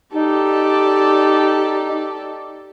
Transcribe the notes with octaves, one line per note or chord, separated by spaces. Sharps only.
D#4 G4 A4 D5